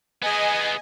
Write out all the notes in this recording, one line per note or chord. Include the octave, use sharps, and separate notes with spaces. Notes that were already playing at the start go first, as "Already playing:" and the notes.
B3 G#4 D#5 G#5